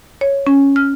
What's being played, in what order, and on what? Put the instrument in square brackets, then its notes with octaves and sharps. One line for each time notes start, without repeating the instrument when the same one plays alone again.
[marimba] C#5
C#4
F6